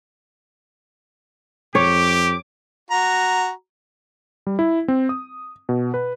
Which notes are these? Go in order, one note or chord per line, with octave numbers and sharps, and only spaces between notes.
F2 G4 C#5 D6
F#4 A#5
G3
E4
C4
D#6
B2
B4